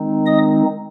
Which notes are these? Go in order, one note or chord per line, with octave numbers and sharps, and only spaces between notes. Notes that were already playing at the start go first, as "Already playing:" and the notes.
Already playing: D#3 G#3 C4 D#4
D#5 D#6